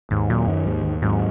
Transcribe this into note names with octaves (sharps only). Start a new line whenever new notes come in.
D#2 G#2
A#2 F#3
F#2 D#3
D#2 G#2
D#2
G#2 F#3